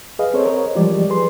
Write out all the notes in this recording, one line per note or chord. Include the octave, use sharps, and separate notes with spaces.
G#4 B4 D#5 F5
C4 A4 C5 C#5
A#4 C#5 D#5
E3 F3 G3 G#3 G4 D5
G#4 B4 C6